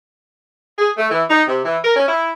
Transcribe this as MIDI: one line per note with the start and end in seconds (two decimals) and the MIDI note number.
0.79 0.91 68
0.97 1.09 57
1.11 1.24 52
1.30 1.43 63
1.48 1.61 48
1.65 1.78 52
1.84 1.94 70
1.96 2.07 61
2.09 2.32 64